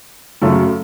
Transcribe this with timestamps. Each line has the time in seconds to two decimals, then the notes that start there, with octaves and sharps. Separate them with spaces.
0.41 F#2 C#3 F#3 A3